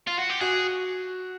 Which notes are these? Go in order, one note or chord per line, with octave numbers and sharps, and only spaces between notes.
F4
F#4
G4
F#4 G#4